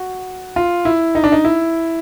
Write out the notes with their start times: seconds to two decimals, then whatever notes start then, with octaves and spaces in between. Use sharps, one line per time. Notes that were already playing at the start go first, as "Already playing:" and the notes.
Already playing: F#4
0.56 F4
0.85 E4
1.15 D#4
1.24 D4
1.32 D#4
1.45 E4